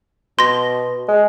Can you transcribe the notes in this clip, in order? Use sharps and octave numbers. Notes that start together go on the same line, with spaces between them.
B2 C6 A#6
G#3